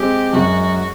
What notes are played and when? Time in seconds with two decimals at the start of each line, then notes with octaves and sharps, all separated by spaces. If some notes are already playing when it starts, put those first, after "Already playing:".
Already playing: G#3 C4 G4
0.33 F#2 F#4